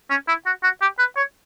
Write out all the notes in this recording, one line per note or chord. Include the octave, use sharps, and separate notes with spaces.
C#4
E4
F#4
F#4
G4
B4
C#5